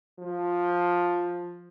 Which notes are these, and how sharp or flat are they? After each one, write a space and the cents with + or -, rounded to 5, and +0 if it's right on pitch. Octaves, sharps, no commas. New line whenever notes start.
F3 +10